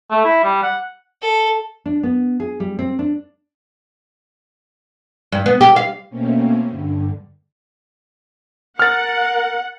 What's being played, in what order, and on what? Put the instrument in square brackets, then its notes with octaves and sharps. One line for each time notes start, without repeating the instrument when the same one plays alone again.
[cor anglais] A3
E4
G3
F#5
[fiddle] A4
[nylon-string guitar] D4
B3
G#4
G3
C4
D4
[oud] G2
B3
G4
F5
[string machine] B2 A3 A#3 C4 C#4
G2 D3
[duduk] A#4 [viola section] F#5 [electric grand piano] F6 A6